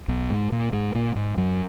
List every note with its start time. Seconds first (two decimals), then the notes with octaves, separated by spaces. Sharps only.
0.08 B1 B2
0.30 G#2 G#3
0.52 A#2 A#3
0.73 G#2 G#3
0.95 A#2 A#3
1.16 G#2 G#3
1.37 F#2 F#3